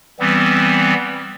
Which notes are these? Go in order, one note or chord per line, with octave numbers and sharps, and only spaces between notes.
E3 G3 B3 C4